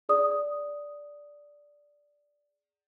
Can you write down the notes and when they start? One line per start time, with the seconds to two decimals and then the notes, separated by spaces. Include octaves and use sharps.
0.09 G#4 D5 D#6